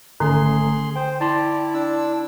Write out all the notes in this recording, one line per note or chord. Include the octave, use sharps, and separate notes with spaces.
G#1 D3 A3 C#4 G#4 C6
C5 G5
E4 D5 G5 A5 C6
D4 E6